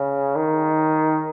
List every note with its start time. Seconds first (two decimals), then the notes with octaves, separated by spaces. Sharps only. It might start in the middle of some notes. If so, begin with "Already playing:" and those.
Already playing: C#3
0.36 D#3